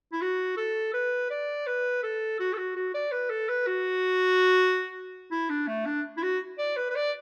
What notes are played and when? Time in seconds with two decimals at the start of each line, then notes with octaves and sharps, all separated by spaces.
0.13 E4
0.21 F#4
0.57 A4
0.93 B4
1.31 D5
1.67 B4
2.03 A4
2.40 F#4
2.53 A4
2.58 F#4
2.76 F#4
2.94 D5
3.12 B4
3.30 A4
3.49 B4
3.67 F#4
5.31 E4
5.50 D4
5.67 A3
5.86 D4
6.17 E4
6.23 F#4
6.58 D5
6.76 B4
6.90 B4
6.95 D5